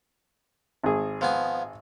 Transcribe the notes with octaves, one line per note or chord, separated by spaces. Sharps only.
G#1 G#4
F3 B3 G#5